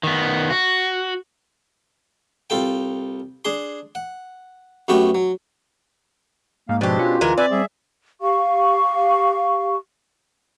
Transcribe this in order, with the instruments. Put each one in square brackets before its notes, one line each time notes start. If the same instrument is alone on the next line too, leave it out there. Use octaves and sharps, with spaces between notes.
[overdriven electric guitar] D#3 B3
F#4
[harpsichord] C2 F4 A4 G5
D4 G#4 C6
F#5
F#2 A3 B3 F#4 G4 C#6
F#3
[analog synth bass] G#2 [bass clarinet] A#3 [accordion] F5
[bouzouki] B2 G4 [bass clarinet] F3 [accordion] G#3 C4 D4
[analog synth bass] C#4 [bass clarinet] F4
[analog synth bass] D2 [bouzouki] E3 G#3 A#4
[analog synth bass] C4 [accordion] B4 E5 G#5 [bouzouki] D5
[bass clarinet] G3 [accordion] G#4 E5
[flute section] G4 F5 C#6